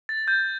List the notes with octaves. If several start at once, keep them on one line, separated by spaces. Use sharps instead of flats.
A6
G6